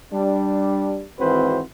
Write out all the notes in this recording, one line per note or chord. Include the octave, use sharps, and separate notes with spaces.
G3 D4
G#1 E3 C4 F#4 B4 C5